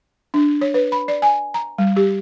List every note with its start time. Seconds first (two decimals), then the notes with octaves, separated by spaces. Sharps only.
0.34 D4
0.61 C#5
0.74 B4
0.92 B5
1.08 D5
1.22 G#5
1.54 A#5
1.78 G3
1.97 G4